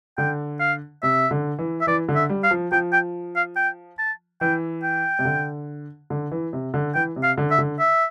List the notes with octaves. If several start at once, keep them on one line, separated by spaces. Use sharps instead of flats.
D3 G5
F5
C3 E5
D3
E3
E5
E3 D5
D3
E5
G3
F5
F3
F3 G5
G5
F5
G5
A5
E3 G5
G5
C3
D3
D3
E3
C3
D3
E3 G5
C3
F5
D3
E5
D3
E5